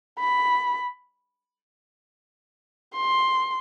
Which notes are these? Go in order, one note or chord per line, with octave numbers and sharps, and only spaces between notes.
B5
C6